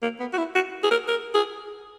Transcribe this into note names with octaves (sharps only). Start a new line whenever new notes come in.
A#3
B3
F#4
E4
F#4
G#4
A#4
A#4
G#4